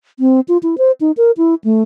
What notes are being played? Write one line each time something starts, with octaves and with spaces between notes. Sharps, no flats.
C4
F4
E4
C5
D#4
A#4
E4
A3